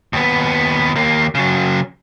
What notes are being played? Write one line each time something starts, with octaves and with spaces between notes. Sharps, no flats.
D#2 B3
D#2 A#3
C#3 F#3